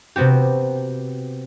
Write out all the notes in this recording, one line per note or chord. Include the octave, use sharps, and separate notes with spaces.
C3 B3 C4 F#4 G4